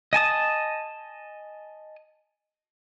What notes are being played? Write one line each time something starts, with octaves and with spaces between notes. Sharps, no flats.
D#5 G#5 A5 D#6